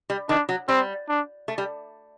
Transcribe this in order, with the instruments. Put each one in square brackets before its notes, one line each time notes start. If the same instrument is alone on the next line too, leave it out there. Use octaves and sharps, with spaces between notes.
[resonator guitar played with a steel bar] G3
[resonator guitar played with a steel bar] D#3 [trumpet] D4
[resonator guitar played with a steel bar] F#3
[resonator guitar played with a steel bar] G3 [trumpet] C4
[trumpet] D4
[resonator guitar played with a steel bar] A3
G3